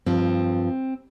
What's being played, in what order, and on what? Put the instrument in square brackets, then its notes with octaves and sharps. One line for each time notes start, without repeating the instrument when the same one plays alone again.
[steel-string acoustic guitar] G2 F3 C4